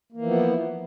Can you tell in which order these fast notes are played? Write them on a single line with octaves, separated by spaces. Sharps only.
A#3 E3 F3 B3 E4